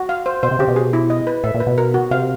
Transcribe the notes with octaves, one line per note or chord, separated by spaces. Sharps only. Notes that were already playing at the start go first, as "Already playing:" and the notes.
Already playing: F#4
F5
C5
B2 C5
C3
C#3 G4
B2
G#4
E4
D#5
B4
A2 E5
A#2
B4
B2
A#4
F#4
C3 F5